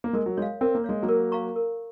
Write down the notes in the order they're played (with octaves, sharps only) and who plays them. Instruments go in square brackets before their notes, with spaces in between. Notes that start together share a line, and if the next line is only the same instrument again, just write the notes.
[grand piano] A#3
[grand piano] G#3 [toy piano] A#4
[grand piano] F#3
[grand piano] G#3 [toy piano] C#5
[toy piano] F5
[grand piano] C4 [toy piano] A#4
[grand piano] A#3
[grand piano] G#3 [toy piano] C#5 F5
[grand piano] F#3 A#3
[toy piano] A#4
F5 A#5 C#6
A#4